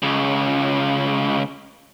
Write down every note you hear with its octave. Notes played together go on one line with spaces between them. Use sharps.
C#2 C#3